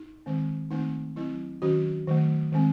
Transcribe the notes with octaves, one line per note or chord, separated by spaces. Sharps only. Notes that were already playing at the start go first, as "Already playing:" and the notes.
Already playing: D#4
D#3 G#3 C4
D#3 A3 C4 D#4
F#3 C4 E4
D#3 F#3 C#4 F#4
D#3 F#3 A3
D#3 G#3 C4